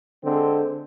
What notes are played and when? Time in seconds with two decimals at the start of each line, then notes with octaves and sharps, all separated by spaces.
0.24 D3 G#3 C4